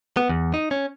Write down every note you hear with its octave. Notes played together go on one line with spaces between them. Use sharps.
B3
E2
D#4
C#4